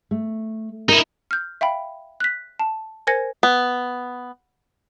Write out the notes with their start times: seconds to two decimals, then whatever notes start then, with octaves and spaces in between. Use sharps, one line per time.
0.11 A3
0.89 D#4 E4 A#4
1.31 F6 G6
1.61 E5 F5 G5 B5
2.20 F#6 B6
2.59 A5
3.07 A#4 C5 G#5 G#6 A#6 C#7
3.43 B3